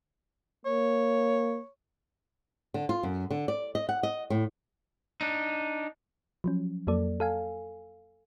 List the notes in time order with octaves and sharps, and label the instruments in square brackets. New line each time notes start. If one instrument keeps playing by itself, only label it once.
[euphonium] A#3 [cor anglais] C#5
[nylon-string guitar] D3
F4
F#2
D3
D5
D#5
F#5
D#5
A2
[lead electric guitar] D4 D#4
[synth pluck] F3 F#3 C#4
F2 F#3 A#3 A4 D5
A4 F5 G#5